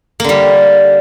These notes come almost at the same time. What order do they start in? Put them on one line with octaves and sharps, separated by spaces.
A#3 D3 G3